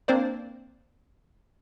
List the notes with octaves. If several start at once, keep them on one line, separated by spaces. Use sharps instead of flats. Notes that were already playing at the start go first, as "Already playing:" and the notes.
A#3 C4 D4 C5 D5